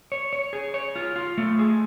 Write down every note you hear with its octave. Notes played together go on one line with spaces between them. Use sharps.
C#5
C#5
G#4
C#5
F4
F4
A3
G#4